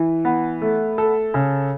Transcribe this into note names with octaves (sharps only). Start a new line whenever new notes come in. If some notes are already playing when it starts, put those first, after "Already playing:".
Already playing: E3
B3
A3
A4
C#3